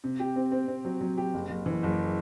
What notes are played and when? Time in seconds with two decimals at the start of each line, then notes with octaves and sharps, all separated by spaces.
0.04 C3
0.20 G4
0.36 C4
0.52 C4
0.68 C4
0.85 F#3
1.01 F#3
1.18 G4
1.34 F#1
1.50 F#1
1.66 E3
1.83 F#1